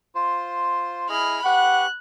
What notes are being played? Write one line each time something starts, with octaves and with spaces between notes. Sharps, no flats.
F4 C5
E4 G#4 D#5 B5 F6
G4 B4 F#5 C#6 F#6